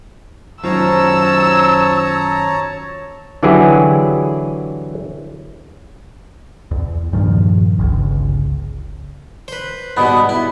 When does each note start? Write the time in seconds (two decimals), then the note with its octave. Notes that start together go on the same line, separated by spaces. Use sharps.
0.64 F#2 D#3 F4 C5 C#5 A5 A#5 E6
3.43 D3 E3 F#3 E4 G4 G#4
6.71 E2
7.13 G2 A#2 D#3 F3
7.79 G1 C#2
9.48 B4 C5
9.97 G#2 B2 G3 B3
10.29 E4